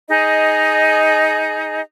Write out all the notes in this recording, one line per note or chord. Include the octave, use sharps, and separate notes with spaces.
D#4 G#4 D#5